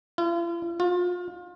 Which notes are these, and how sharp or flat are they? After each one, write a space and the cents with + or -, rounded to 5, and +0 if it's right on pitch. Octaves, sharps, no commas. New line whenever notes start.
F4 -45
F4 +30